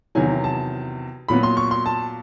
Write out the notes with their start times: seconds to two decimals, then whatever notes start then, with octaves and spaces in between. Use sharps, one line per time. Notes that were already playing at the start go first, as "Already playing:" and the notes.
0.15 E2 C3 D#3 F#3 G#5
0.44 A5
1.28 A#2 F#3 B3 B5
1.43 C6
1.57 C#6
1.71 C6
1.86 A5